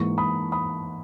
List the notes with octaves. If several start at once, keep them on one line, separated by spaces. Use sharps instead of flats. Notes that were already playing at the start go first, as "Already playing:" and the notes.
Already playing: G#2 E3 A#3 C#6
B5 D#6
B5 D#6